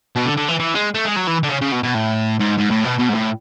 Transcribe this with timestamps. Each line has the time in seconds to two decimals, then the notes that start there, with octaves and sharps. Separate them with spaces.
0.16 B2
0.26 D3
0.37 D3
0.49 E3
0.60 E3
0.75 G#3
0.95 A3
1.05 G#3
1.16 F#3
1.27 E3
1.43 D3
1.49 C#3
1.61 C#3
1.72 B2
1.83 B2
1.94 A2
2.40 G#2
2.58 G#2
2.70 A2
2.84 B2
2.98 B2
3.09 G#2
3.14 A2